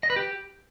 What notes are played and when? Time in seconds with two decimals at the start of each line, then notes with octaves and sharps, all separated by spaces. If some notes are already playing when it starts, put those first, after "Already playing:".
0.03 D#5
0.10 B4
0.16 G4